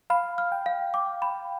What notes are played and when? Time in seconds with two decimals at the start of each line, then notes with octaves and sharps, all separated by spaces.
0.10 F5 B5
0.38 F6
0.52 G5
0.66 F5
0.94 G5 D6
1.22 G5 B5